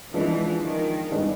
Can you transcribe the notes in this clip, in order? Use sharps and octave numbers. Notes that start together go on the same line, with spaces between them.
E3 F3 G#3 B3 D4
D#3
G2 D#3 G#3 B3 D4